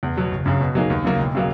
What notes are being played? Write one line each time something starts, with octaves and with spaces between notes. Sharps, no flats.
E2
B2 F#3
F#1
F#2 C#3
B2
F#3 A#3 D#4 G#4
D#2
C#3 F#3 A#3
E1
C#3 F#3 A#3